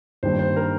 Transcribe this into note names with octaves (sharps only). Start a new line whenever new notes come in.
G2 D#3 G3 A#3 C5
C5
A#4